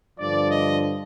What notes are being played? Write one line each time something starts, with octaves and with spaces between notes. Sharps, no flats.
G2 D3 F3 D5
D#5